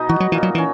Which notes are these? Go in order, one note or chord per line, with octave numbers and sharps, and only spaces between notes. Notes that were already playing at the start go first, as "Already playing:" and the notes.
Already playing: B2 D#4
E3 F#4
F#3
A#2 E3
F#3
E3
C#4